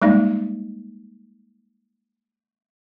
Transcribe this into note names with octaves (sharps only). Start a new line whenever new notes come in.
G3 G#3 A#3 D#4